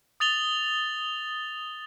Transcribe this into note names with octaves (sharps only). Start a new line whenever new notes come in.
D#6 A6 F7 G7